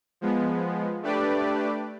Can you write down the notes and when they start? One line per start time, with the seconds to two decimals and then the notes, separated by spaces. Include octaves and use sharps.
0.21 F3 G#3 B3
1.03 A3 D4 G4 B4 D5